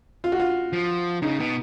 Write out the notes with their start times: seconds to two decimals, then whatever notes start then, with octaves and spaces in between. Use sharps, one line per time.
0.24 F4
0.32 F#4
0.40 F4
0.73 F3
1.22 C#3 D#4
1.40 B2